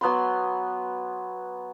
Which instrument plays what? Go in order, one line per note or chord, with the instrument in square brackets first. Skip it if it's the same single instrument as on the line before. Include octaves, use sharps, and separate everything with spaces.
[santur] F#3 B3 B5 C6